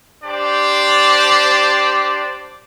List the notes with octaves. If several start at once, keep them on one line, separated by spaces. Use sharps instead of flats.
D4 G4 C5 D5